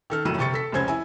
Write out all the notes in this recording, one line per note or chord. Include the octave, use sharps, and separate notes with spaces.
D#3 A4 F6
F#1 F2 A2 F#3 D#7 E7
G1 C3 G4 C#6 A6 C#7
A4 B6
F1 C#2 C#4 C5 G#6
E4 G#5